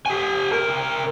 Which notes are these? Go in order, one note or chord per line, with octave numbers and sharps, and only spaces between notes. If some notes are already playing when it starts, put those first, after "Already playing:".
G4 G#5
C3 A#4